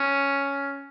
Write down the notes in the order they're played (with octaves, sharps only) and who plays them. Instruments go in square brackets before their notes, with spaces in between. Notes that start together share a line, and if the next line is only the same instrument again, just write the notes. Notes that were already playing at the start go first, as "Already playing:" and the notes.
Already playing: [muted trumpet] C#4